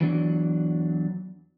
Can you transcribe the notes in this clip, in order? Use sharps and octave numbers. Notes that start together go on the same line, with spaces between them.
E2 E3 F#3 D4